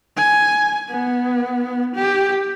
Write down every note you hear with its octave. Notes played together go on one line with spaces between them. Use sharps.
G#5
B3
G4